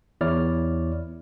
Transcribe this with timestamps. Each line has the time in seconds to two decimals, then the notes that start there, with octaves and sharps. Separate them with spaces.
0.21 E2 E4 C#5 D5 F6